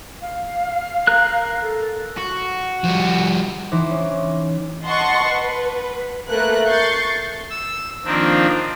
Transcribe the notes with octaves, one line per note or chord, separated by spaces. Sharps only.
F5
A#4 F#6
A4
F#4
F3 G3
E3 D#4 C5 D6
C#4
D#5 F#5 A5 C6 C#6
B4
A3 A#3 A#4 B4 F#6
C#6 G6 A6 C7
E6
D#3 F3 A#3 C4 D4